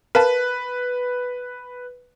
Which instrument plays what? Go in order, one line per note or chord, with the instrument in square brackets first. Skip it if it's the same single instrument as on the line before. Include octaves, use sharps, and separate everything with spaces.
[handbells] A#4 F5 A5 [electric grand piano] B4